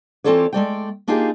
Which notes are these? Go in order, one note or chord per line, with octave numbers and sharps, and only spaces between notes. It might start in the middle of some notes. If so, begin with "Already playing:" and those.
E3 C4 F4 A4 C#5 D5
G#3 A3 D5 G5
A#3 D4 D#4 F4 G4 G#4